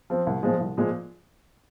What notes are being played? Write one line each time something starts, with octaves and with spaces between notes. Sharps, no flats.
F3 C4
C2
A#2 F3 G#3
C2
A#2 F3 G#3